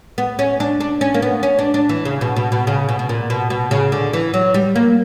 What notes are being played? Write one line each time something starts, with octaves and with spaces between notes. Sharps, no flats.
B3
C#4
D4
D4
C#4
A#3
B3
C#4
D4
D4
E3
C#3
B2
B2
B2
C#3
B2
B2
A#2
B2
B2
C#3
D3
E3
F#3
G3
A#3